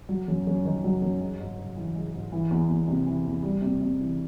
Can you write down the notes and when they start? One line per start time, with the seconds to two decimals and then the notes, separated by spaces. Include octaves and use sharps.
0.09 F#3
0.28 F#2
0.47 F#2
0.65 D#3
0.84 F#3
1.02 F#2
1.20 G#3
1.39 G#2
1.58 G#2
1.76 E3
1.95 G#3
2.14 G#2
2.32 E3
2.51 E2
2.69 E2
2.88 C3
3.06 E3
3.25 E2
3.43 G3
3.62 C3
3.80 C3
3.99 E3